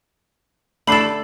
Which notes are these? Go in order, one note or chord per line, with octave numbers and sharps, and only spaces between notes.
D3 A3 D4 A4 B5 C7 F#7